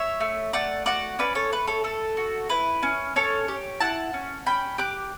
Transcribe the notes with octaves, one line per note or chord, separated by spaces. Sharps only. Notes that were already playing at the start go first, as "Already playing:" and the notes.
Already playing: C#5 E5
A3
A3 D5 F#5
F#4 D5 F#5
C#4 B4 D5
A4 C#5
A3 B4
A4 C#5
A3 A4
F#4
E4 B4
C#4
C#4 A4 C#5
G4
E4 F#5 A5
C#4
C#4 G5 B5
G4 D6 F#6